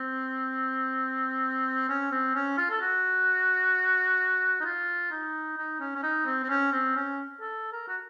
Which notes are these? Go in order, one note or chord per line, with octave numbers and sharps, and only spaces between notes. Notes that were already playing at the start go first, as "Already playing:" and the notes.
Already playing: C4
C#4
C4
C#4
F4
A4
F#4
D#4
F4
D#4
D#4
C#4
C#4
D#4
C4
C4
C#4
C4
C#4
A4
A#4
F#4